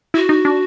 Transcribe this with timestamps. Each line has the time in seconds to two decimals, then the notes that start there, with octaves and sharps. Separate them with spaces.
0.14 E4 F#4
0.29 D#4
0.45 D4